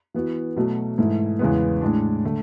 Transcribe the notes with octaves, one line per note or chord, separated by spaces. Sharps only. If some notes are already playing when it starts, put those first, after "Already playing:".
E3 B3 F#4
B2 F#3 A3
G#2 E3 A3 E4
E2 C#3 E3 G#3 B3
A2 G#3 D4
D3 A3